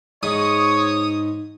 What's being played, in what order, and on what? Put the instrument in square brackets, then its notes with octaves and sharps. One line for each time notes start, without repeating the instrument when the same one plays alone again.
[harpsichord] G#2 [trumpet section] C#5 [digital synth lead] D#6